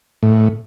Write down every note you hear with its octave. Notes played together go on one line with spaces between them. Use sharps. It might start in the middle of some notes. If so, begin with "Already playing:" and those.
A2